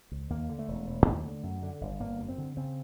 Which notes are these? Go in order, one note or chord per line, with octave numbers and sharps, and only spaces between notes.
C#2
D#2 A#3
D3
A3
E1
E1
D#2
D3
F#2
D3
G1
G1 A#3
F#2
C4
D3
C#3 C4